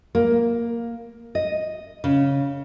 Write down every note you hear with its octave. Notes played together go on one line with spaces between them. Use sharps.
A#3
D#5
C#3